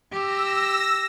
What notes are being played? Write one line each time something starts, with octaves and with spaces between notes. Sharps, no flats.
G4 E6 A#6